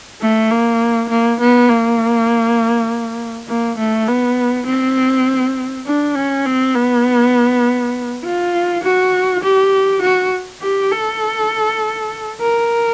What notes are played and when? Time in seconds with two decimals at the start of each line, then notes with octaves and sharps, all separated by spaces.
0.21 A3
0.50 A#3
1.09 A#3
1.40 B3
1.68 A#3
3.47 A#3
3.78 A3
4.08 B3
4.66 C4
5.86 D4
6.15 C#4
6.45 C4
6.75 B3
8.23 F4
8.83 F#4
9.43 G4
10.02 F#4
10.62 G4
10.91 A4
12.40 A#4